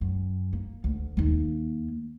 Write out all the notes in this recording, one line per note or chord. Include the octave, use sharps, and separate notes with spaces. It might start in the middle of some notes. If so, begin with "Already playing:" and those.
F#2
A#3
D2
D#2 A#3